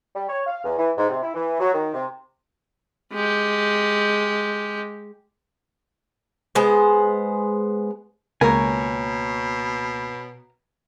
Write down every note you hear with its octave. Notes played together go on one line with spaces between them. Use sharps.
G3
C#5
F5
E2
E3
G#2
C3
E4
E3
F#3
D#3
C3
G#3 G4
G#3 B3 C5
C#2 B2 A#3 A#4 C#5 G#5